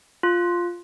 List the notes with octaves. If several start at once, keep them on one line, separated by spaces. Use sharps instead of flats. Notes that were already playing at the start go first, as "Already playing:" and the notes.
F4